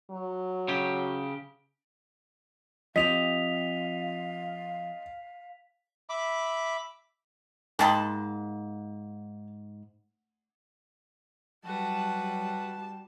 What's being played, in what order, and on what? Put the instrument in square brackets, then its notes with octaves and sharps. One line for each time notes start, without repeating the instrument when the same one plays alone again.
[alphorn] F#3
[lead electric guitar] C#3 G4
[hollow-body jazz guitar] F3 C4 G4 [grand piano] D#5 [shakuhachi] F5 [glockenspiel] B6 F7
[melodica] E5 B5 D6
[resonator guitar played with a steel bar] G#2 [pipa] A#3 A5 B5 [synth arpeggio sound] G5 C6 D#6
[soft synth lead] F#3 [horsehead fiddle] G3 [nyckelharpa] F#4 B4 [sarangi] A5